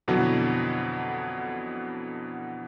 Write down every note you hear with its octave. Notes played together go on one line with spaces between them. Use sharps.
F2 B2 D3 E3 F#3